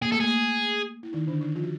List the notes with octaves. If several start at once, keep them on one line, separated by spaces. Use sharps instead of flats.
A#3 G#4
A3 A4
A#3 G#4
E4
D#3 D#4
D3 D4
D#3 D#4
F3 F4
F#4